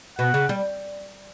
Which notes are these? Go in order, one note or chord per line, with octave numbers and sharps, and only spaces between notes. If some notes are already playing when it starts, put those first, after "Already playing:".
B2 F#5
C#3
G3